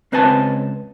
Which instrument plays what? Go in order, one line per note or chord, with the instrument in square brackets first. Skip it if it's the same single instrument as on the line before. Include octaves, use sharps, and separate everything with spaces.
[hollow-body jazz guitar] C#2 C4 B4 D#5 G#5 A5